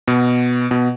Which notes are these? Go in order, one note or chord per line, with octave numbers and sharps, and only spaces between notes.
B2
B2